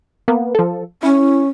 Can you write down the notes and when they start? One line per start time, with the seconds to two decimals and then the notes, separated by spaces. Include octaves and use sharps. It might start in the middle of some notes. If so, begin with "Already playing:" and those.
0.28 A#3 B3
0.55 F3 A4
1.03 C#4 E4